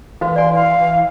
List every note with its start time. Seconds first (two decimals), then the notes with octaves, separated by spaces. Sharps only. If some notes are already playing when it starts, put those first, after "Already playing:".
0.21 E3 F#4 B4 F5
0.36 D5 G#5 C6
0.55 F5